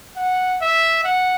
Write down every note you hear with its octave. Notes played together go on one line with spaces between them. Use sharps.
F#5
E5
F#5